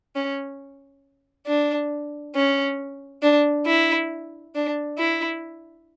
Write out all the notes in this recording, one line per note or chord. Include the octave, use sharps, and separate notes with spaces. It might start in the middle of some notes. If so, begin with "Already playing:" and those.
C#4
D4
C#4
D4
E4
D4
E4